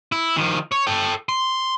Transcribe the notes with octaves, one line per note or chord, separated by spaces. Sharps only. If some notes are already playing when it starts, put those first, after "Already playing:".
E4
D#3 F3
C#5
A4 G5
C6